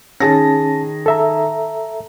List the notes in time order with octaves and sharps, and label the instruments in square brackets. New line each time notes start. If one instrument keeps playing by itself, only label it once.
[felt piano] D#3 G#4 A#6 [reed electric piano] C#4 A5
[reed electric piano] A4 E5 A#5